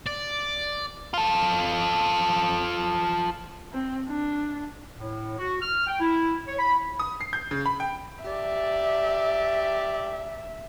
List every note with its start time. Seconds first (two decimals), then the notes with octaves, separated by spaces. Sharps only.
0.06 D5
1.14 F4 A4
3.73 C4
4.08 D4
4.98 A2
5.38 F#4
5.62 F6
5.87 G5
6.00 E4
6.47 C#5
6.58 B5
6.99 D#6
7.21 C7
7.33 G6
7.51 C#3
7.66 B5
7.80 G5
8.25 G4 D5 E5